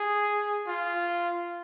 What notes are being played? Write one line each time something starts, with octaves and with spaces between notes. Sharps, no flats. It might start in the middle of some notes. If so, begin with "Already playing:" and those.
Already playing: G#4
F4